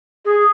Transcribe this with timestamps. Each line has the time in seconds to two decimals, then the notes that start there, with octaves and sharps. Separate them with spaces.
0.25 G#4